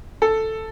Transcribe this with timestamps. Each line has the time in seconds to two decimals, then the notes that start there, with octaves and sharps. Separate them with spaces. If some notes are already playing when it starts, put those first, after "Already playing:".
0.22 A4